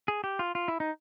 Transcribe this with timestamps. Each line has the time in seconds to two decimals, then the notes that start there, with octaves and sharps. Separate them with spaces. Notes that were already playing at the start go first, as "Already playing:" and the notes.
0.08 G#4
0.24 G4
0.39 F4
0.55 F4
0.68 E4
0.80 D#4